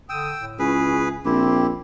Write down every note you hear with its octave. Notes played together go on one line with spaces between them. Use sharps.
D3 G5 D#6 E6
A2
C#2 C#4 E4 G#4 B4
A#1 C4 E4 G4